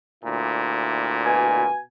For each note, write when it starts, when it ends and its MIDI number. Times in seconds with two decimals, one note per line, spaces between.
0.23 1.66 38
0.23 1.66 46
0.23 1.66 64
1.26 1.79 47
1.26 1.79 80